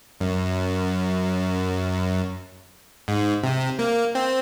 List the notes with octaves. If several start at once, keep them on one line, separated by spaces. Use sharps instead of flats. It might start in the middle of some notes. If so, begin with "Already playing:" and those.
F#2
G#2
C3
A#3
C4